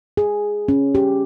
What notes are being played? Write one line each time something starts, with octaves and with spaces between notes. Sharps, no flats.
G#4
C#4
G4